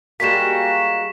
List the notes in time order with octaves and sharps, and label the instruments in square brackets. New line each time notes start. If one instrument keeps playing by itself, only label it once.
[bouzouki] G3 G#3 A#3 [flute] F#4 [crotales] B6 E7